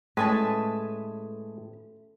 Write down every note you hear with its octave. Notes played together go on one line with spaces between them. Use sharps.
A2 G#3 A3 C#4 B4 G#5 A5